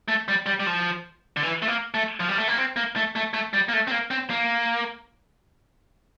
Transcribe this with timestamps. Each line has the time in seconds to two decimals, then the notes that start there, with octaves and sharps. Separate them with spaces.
0.08 A3
0.28 G3
0.46 G3
0.60 G3
0.67 F3
1.37 D3
1.43 E3
1.62 A3
1.68 A#3
1.94 A3
2.20 F3
2.29 G3
2.38 A3
2.48 A#3
2.58 C4
2.76 A#3
2.96 A3
3.16 A3
3.34 A3
3.54 G3
3.69 A#3
3.73 A3
3.87 C4
3.91 A#3
4.11 C4
4.30 A#3